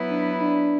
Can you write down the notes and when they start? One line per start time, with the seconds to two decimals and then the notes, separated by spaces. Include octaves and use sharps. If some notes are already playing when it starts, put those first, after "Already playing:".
Already playing: F#3 B3 E4 B4
0.10 D4
0.41 D4